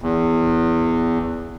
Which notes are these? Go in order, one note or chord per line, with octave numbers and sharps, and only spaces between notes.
E2